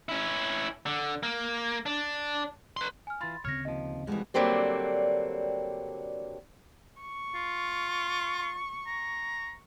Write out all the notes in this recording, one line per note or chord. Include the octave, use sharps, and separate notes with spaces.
C#4 E4
D3
A#3
D4
B4 C6
G#5 F6
E3 F4 B5 C6 A6
D2 C#3 C4 C#5 F6 A#6
D#2 F3 D#5
F2 B2 E3 G3 G#3
D3 F#3 G3 A#3 C4 D4
C#6
F4
A#5